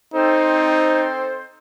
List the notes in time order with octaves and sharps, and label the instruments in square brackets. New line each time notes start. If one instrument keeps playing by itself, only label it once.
[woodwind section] C4 A4 C5 [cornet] D#4